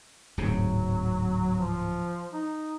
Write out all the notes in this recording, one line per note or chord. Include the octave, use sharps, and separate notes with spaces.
D1 G#2 C3 F#3
F3
D#4